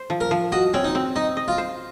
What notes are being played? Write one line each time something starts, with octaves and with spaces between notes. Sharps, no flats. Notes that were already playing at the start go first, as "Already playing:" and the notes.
Already playing: C5
F3
A#4
F3
F#4 D#5
C4 C#4
D#4
C4
D#4 D#5
D#5
F4
C5